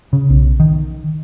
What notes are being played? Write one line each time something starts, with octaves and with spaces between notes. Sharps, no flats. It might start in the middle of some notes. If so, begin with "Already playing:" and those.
C#3
B1
D#3